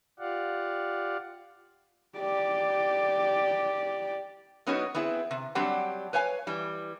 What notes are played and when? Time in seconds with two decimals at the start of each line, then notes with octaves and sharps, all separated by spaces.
0.19 F4 G4 D5 F5 F#5
2.18 G4 D5
4.67 F#3 B3 C#4 D#4 F#4 C#5
4.95 B3 C4 E4 G#4
5.31 C3
5.55 F#3 G3 C4 D4 G4 F#5
6.13 B4 C#5 F5 G#5
6.47 E3 G3